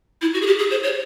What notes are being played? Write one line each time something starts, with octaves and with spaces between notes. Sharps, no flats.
E4
F#4
G#4
G4
G#4
C5
C#5